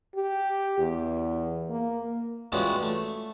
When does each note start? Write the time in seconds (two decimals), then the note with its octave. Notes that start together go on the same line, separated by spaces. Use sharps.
0.16 G4
0.79 E2
1.70 A#3
2.52 E3 G3 G#3 C#4 F4 F#4
2.82 A3